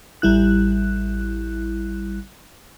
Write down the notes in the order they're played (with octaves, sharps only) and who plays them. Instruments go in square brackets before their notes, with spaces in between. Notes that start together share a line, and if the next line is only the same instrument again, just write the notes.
[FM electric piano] A1 G3 E4 F#6